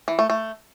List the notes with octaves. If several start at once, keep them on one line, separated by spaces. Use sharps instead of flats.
E3
A3
A3